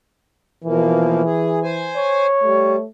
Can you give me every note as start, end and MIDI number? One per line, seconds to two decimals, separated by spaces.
0.64 1.22 47
0.64 1.99 52
0.64 1.22 53
0.64 1.22 58
1.25 1.59 68
1.63 2.27 72
1.63 2.27 80
1.96 2.83 73
2.43 2.76 55
2.43 2.87 57